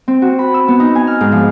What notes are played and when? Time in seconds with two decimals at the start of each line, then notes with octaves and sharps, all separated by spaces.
0.08 C4
0.22 F#4
0.39 B5
0.54 E6
0.68 B3
0.80 D#4
0.95 G#5
1.07 F6
1.21 G#2
1.32 F3